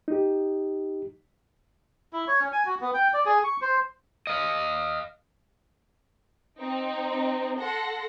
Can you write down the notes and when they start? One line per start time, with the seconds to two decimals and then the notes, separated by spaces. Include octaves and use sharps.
0.08 D#4 G4
2.13 E4
2.28 C#5
2.40 C#4
2.52 G#5
2.66 F#4
2.81 B3
2.94 G5
3.13 D5
3.26 G#4
3.44 C#6
3.62 C5
4.27 D#5 F5
6.59 C4 D#4
7.58 A4 F#5 C6 A#6